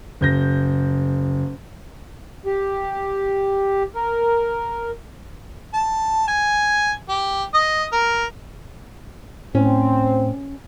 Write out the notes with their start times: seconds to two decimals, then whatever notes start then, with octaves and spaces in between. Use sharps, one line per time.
0.21 F#1 G6 A#6
2.46 G4
3.95 A#4
5.74 A5
6.28 G#5
7.09 G4
7.54 D#5
7.93 A#4
9.55 A2 C4 C#4